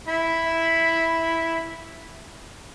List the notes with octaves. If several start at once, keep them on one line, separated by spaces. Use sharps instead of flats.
E4 B5